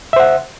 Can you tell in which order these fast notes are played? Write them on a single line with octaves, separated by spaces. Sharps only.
E5 C5 F#5